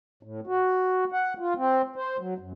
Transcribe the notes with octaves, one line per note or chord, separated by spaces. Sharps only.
A2
F#4
F#5
F4
C4
C5
F#3
F#2